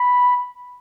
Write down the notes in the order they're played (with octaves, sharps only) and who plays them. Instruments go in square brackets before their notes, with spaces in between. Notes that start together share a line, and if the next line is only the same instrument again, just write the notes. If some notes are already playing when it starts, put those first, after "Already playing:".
Already playing: [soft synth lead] B5